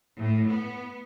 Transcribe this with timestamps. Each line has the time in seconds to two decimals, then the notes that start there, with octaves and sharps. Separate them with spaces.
0.18 A2
0.50 B3